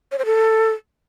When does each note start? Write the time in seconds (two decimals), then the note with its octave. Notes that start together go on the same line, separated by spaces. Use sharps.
0.12 C#5
0.19 C5
0.26 A4